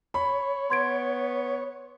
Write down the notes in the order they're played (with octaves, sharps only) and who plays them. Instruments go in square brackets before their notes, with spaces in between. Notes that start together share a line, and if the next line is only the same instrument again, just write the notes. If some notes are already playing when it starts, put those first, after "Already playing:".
[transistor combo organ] C#5 [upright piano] B5
[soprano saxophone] B3 [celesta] C6 G#6 D7